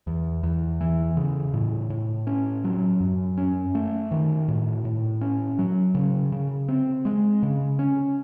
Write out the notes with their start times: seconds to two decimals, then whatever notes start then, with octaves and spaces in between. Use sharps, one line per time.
0.07 E2
0.43 E2
0.81 E3
1.17 C#3
1.54 A2
1.90 A2
2.27 C#4
2.64 F#3
3.00 F#2
3.38 C#4
3.75 A3
4.11 D#3
4.48 A2
4.85 A2
5.21 C#4
5.59 F#3
5.95 C#3
6.32 C#3
6.68 C4
7.05 G#3
7.43 C#3
7.79 C#4